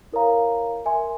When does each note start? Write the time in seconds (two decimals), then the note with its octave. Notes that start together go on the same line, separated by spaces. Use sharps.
0.12 E4 A#4 C#5 F5 A#5
0.85 A#4 E5 G#5 C6